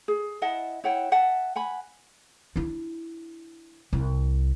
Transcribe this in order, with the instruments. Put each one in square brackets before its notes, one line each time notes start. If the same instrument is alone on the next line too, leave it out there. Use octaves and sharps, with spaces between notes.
[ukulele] G#4
E4 D#5 F#5 A5
E4 C#5 F#5 G5
E5 F#5 A5
F#5 G#5 B5
[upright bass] D4 E4
C2